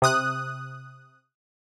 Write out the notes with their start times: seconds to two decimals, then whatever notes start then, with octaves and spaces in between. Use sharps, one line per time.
0.02 C3 D#6 F#6